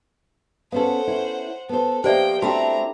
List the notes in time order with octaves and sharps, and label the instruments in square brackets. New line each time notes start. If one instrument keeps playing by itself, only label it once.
[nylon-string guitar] B3 C#4 A4 [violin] C5 F#5 [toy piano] F5
[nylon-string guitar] C#4 E4
[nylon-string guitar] B3 C5 [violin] A4
[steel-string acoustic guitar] F3 A#3 [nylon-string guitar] G4 [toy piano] C5 D5 E5 [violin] G5
[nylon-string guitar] A3 [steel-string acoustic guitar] C4 D4 E4 [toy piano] F#4 [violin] A#5